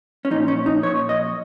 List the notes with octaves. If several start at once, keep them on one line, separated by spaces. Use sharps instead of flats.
C#4
A#2 F3 D#4
C#4
D#4
A#2 F3 C#5
D#5